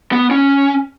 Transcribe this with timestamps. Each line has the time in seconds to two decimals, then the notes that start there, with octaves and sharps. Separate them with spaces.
0.12 B3
0.31 C#4